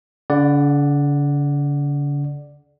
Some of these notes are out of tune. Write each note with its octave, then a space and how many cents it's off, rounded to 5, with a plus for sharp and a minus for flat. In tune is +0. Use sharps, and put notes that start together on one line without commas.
D3 -45 D5 +5 F#5 +0